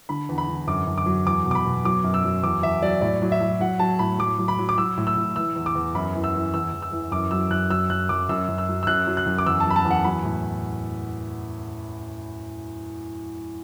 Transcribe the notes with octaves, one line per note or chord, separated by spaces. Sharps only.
D3 B5
E2
B5
D3
F#2 D6
F#2
D6
F#3
E2 D6
B2
D6
B5
B2
F#3 D6
F#2
E6
F#3
E2 D6
E2 E5
F#3 D5
A2 D5
F#3
E5
F#3
F#3 F#5
F#3 A5
A2 B5
F#3 D6
F#3
B5
F#3
D6
F#3 E6
A2
E6
A2
E3 E6
E2
D6
E2
F#2 B5
E3
E6
E3
E2 E6
E2
E6
E3
F#2 D6
F#3 E6
F#2 F#6
F#3 E6
F#2 F#6
F#2 D6
F#2 E6
F#2
E6
F#3
E6
F#2 F#6
F#3
F#6
F#2
D6
E2 E6
F#3 A5
B5
A5
E2
F#5
F#3 B5
A2